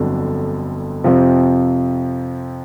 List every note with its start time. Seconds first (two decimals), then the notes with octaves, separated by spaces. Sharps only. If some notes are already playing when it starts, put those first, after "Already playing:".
Already playing: G1 F2 D3 F#3
1.04 F2 C3 F3